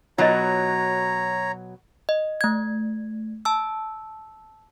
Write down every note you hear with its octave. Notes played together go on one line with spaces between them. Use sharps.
B2 F#3 D#4 F4 C#5 D#5 A#5
D#5
A3 G#6
A5 E6